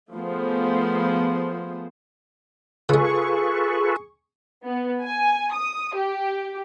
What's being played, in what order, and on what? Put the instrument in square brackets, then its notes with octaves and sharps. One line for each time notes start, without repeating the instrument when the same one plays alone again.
[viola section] F3 A3 B3 G#4 C5
[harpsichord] C#3 G#3 [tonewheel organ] F4 A4 B4 [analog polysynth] G#4 C#6
[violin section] B3
G#5
D#6
G4